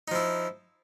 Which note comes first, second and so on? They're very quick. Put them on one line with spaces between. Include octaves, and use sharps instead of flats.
D#4 F3 E4